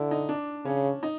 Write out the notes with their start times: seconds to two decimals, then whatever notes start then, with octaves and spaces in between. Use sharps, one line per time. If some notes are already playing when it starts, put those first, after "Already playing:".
Already playing: D3 E4
0.11 D#4
0.29 D4
0.65 C#3 C#4
1.03 D#4